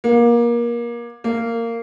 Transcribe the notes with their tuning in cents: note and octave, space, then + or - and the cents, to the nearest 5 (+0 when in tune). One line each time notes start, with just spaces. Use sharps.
A#3 +25
A#3 -15